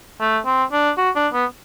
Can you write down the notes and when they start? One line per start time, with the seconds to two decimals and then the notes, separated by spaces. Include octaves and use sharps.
0.20 A3
0.45 C4
0.72 D4
0.98 F#4
1.16 D4
1.33 B3